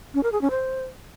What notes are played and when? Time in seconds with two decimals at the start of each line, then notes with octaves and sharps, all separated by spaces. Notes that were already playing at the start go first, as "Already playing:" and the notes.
0.14 C#4
0.23 A#4
0.32 G#4
0.41 C#4
0.51 C5